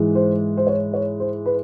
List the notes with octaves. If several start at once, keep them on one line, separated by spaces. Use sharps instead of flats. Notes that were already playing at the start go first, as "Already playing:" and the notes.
Already playing: G#2 E3 G#3
C5
C5
C#5
C#5
C5
B4